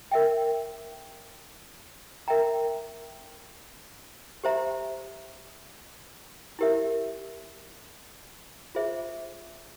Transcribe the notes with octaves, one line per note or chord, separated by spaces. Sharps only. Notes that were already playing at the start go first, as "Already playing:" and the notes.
A#4 E5 G5
A#4 E5 G5 A#5
G4 C5 E5 A#5
E4 G4 A#4 E5
F4 G#4 C5 E5